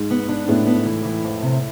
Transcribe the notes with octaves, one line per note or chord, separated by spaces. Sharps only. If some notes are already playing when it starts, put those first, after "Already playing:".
Already playing: G#2
B3
D4
A2 B3
B3
E3
E3
F2
C3